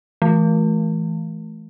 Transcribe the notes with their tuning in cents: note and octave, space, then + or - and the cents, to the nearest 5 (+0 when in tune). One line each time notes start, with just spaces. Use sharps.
E3 +0 A3 -30